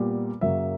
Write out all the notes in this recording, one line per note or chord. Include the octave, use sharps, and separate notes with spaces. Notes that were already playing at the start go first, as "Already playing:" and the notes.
Already playing: A#2 G3 B3
F#2 C#3 F#3 A#3 E5